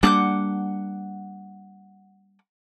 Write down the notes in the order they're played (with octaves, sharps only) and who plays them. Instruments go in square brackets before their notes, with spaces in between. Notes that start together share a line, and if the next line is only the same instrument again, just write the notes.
[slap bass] G3 A#3 D4 [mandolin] F#5 D6 G6